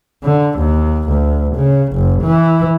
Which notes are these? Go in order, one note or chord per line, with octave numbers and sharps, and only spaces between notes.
D3
D#2
D2
C#3
F#1
E3